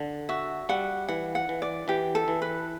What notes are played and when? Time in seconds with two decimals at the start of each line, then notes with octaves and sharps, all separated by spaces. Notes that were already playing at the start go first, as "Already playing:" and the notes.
Already playing: D3
0.29 F#4 E5
0.69 G3 F#5
1.08 E3 F#5
1.35 F#5
1.49 E3
1.62 D5
1.88 E3 G4
2.15 A4
2.28 E3
2.42 B4